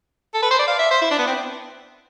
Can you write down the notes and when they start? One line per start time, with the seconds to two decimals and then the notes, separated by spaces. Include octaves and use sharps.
0.34 A4
0.42 B4
0.51 C5
0.59 D5
0.68 F5
0.79 E5
0.91 C5
1.02 E4
1.11 D4
1.18 B3
1.27 C4